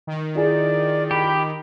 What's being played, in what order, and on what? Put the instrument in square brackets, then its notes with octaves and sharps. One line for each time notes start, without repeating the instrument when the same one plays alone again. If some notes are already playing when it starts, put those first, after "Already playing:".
[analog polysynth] D#3
[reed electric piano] E4 F4 G#4 [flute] D5
[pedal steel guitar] G4 [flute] B5